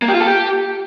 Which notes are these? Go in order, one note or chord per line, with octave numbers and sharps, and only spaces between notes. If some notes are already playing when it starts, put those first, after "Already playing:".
A#3
G4
F4
A4
G4